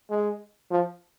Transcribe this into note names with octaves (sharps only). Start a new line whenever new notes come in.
G#3
F3